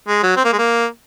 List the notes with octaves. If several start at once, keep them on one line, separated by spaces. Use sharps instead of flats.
G#3
F#3
C4
A#3
G#3
A#3